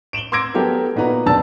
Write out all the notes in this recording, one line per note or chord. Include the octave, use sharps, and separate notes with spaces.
D7 E7 F#7 G7
C6 D6 E6 G#6 A#6 D7
F#3 B3 G4 A4 A#4
A#2 B3 D#4 F#4 B4 A#5
F#1 B2 D4 A5 E6 A6